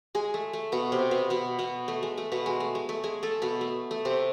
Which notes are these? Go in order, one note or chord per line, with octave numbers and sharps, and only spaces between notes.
G#3 G#4
A3
A3
B2 B3
C3 C4
B2 B3
B2 B3
B2 B3
A3
G#3
A3
B2 B3
G#3
A3
G#3
A3
G#3 G#4
A3 A4
B2 B3
A3
A3
C3 C4